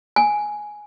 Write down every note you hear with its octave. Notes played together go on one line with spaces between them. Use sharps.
G#5